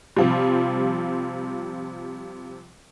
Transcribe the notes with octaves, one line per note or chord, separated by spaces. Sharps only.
C3 F3 G3